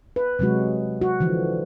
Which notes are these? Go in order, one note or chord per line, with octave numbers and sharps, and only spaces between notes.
B4
C3 F#3 G#3 F#4
F#4
D3 E3 F3